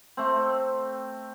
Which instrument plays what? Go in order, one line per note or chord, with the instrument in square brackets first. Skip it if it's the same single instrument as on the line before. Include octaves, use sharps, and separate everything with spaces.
[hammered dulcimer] A3 C4